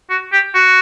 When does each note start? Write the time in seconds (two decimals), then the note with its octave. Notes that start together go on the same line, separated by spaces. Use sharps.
0.10 F#4
0.32 G4
0.55 F#4